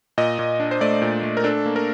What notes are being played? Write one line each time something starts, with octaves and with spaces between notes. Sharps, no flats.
A#2 D#5
A#2
D4
C5
A3 D5
A#2
A3
A#4
D4 A4
A#3
A#4